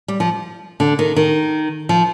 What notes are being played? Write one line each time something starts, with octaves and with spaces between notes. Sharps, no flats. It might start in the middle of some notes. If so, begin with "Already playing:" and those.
G3
F3
D3
D#3
D#3
F3